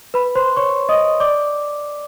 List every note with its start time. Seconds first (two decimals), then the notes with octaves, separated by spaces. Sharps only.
0.14 B4 B5
0.35 C5 C6
0.57 C#5 C#6
0.89 D#5 D#6
1.20 D5 D6